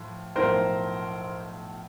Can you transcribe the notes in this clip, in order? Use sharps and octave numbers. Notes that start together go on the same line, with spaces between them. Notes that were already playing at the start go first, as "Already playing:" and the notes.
Already playing: A2 F3
B1 A2 F3 A#4 C5